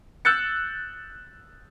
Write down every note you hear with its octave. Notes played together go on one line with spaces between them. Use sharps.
E6 F#6 G6 A6 C#7